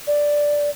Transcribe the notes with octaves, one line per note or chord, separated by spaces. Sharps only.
D5